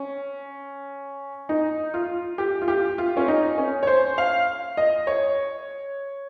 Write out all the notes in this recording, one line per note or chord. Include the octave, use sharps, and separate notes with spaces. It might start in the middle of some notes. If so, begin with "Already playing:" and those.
Already playing: C#4
D#4
F4
G4
F4
G4
F4
C#4
D#4
C#4
C#5
C5
F5
D#5
C#5